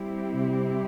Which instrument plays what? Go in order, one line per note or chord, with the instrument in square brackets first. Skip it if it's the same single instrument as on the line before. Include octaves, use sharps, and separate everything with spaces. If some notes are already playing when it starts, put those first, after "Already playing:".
Already playing: [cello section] G3 C4 E4 G4
[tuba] C3